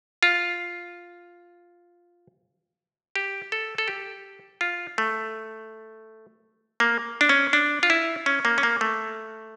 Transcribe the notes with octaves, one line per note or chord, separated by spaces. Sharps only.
F4
G4
A4
A4
G4
F4
A3
A#3
D4
C#4
D4
F4
E4
C#4
A#3
C#4
A#3
A3